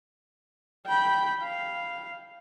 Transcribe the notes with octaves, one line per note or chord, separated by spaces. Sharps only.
G5 B5
F5